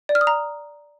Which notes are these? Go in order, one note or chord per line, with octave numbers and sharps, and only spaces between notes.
D5
F6
D#6
A#5